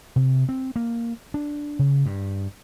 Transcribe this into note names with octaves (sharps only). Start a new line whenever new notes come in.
C3
C4
A#3
D4
C#3
G2